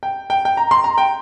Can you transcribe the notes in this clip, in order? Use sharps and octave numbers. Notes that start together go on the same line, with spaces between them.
G5
G5
G5
A#5
C6
A#5
G5